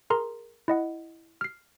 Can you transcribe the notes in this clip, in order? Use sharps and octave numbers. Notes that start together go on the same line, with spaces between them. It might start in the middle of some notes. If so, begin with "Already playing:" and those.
G#4 A#4 A#5 C6
E4 D#5 F#5
F6 C7